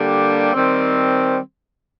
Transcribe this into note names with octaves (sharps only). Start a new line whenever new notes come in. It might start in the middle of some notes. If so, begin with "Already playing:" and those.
Already playing: D3 G3 A#3 D4 G4
D#3 G3 C4